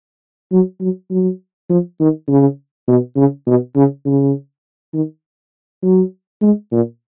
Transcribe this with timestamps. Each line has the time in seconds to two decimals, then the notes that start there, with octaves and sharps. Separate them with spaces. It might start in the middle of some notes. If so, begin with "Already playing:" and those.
0.52 F#3
0.81 F#3
1.11 F#3
1.70 F3
2.00 D#3
2.28 C#3
2.88 B2
3.17 C#3
3.47 B2
3.76 C#3
4.06 C#3
4.94 D#3
5.83 F#3
6.41 G#3
6.71 A#2